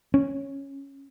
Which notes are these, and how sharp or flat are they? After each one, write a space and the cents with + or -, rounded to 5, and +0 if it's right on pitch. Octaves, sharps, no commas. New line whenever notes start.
C#4 -5